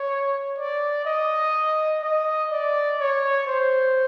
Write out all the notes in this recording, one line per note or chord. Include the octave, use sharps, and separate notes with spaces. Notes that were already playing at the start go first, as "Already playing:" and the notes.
Already playing: C#5
D5
D#5
D#5
D5
C#5
C5